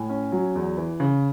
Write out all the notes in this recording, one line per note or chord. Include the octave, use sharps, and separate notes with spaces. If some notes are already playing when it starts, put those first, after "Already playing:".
Already playing: A2 G#5
C#4
F#3
E2
E3
C#3